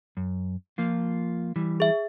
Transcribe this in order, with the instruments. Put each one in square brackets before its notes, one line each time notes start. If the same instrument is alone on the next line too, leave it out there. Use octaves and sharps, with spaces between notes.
[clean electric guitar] F#2
F3 A#3 F4
E3 G3
[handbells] G#4 E5